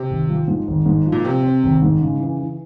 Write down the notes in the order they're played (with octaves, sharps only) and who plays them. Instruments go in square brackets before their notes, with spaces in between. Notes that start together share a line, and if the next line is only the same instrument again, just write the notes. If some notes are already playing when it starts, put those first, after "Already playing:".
Already playing: [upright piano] C3
[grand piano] G#1
F3
G#2
G#1
G#2
F3
[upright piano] A#2
[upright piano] C3 [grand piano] C4
[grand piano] C4
G#1
G#2
C#3
E3
E3